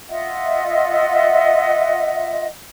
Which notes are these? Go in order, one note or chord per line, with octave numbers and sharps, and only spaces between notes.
F4 D#5 E5 F#5